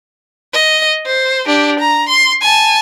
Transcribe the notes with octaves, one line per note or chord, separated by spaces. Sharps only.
D#5
C5
D4 G4
A#5
C6
G#5 A5